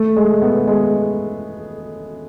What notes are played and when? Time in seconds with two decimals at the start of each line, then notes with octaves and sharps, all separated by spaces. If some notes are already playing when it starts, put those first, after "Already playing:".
Already playing: A3
0.16 G#3
0.42 B3
0.67 G#3